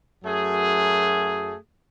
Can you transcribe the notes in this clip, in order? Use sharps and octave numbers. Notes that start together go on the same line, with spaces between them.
F#2 F#3 A3 G#4